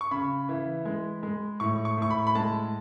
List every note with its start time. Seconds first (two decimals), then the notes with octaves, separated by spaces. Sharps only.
0.01 C#6
0.11 C#3 B5
0.49 E3
0.85 G#3
1.23 G#3
1.60 A2 C#6
1.85 C#6
1.98 A2 C#6
2.10 B5
2.27 B5
2.35 G#3 A5